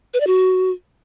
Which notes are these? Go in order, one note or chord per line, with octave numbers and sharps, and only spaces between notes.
B4
D5
F#4